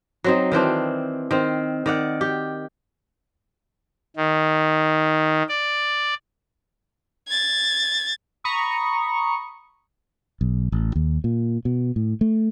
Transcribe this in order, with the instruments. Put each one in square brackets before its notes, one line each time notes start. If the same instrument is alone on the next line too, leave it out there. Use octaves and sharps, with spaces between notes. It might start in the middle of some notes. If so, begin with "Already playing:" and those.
[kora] F#3 C4 D#4
D#3 E3 C4 D4
D#3 C4
D#3 D5 F#5
G4
[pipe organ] D#3
D5
[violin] G#6 A6
[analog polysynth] A#5 B5 C#6 D#6
[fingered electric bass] B1
A1
D#2
A#2
B2
A2
A3